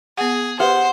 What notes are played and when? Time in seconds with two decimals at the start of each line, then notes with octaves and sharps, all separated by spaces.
0.18 B3 G#4 F#5
0.60 G4 B4 C5 F#5